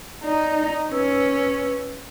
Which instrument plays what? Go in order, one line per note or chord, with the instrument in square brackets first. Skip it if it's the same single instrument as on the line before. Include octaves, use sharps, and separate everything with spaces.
[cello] D#4 [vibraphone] D5
[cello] C#4 [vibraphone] B4 E6